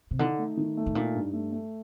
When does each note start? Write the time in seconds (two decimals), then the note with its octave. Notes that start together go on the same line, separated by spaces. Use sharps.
0.11 C3
0.19 D3 D#4
0.38 A3
0.57 D#3
0.77 A3
0.86 A2
0.95 A#2 D#4
1.14 G2
1.33 A3
1.52 A3